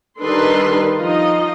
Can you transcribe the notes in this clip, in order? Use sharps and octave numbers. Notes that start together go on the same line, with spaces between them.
D#3 G3 D4 A4 B4 C6
F3 D#4 F4 D#5